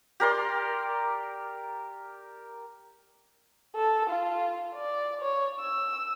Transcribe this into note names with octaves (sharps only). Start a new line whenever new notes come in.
G4 A#4 D5 C6
A4
F4
D5
C#5
E6